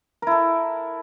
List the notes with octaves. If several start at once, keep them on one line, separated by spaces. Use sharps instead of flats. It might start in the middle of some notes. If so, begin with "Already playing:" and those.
E4 A4 A#4